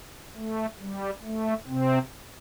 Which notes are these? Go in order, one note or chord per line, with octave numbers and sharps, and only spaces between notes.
A3
G3
A3
C3 C4